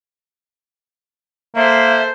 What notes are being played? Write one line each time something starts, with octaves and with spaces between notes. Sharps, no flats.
A#3 A4 C5 E5